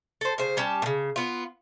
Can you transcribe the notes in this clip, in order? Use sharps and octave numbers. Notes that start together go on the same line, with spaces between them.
A4 C5
C#3 C5
G3 C#4 G4 A5
A#2 C#3
B3 F4